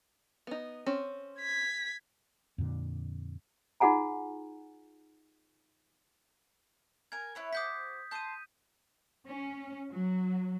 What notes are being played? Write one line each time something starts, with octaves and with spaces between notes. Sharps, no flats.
B3 D#4
C4 C#4
G#6 B6
F2 A#2 D3
D#4 F4 G#4 F#5 G#5 A#5
A#4 G#5 G#6
E4 B4 C#5
F#4 C5 D6 D#6 G6 B6
A5 C6 D#6 G6 D#7
C#4
F#3